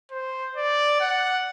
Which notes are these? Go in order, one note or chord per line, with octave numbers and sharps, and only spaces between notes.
C5
D5
F#5